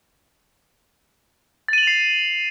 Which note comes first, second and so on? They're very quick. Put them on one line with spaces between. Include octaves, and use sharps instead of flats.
A6 D#7 F#7 F7 C7